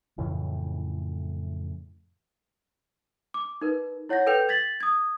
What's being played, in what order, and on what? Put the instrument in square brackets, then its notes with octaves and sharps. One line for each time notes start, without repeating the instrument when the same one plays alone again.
[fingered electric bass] F2 A2 C#3 E3
[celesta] D6
D#4 A#4 B4
E4 C#5 F#5 G6 A#6
A4 B4 G5 G6 F7
G#6 A6 B6 F#7
D#6 G#6